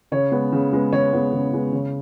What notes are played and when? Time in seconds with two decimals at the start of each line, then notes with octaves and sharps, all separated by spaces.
0.12 C#3 C#5
0.32 G#3 B3
0.52 C#3
0.73 G#3 B3
0.93 C#3 C#5
1.13 G#3 B3
1.32 C#3
1.53 G#3 B3
1.72 C#3